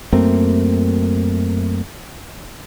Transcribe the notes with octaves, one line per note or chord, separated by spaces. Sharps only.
F#2 A3 A#3 C4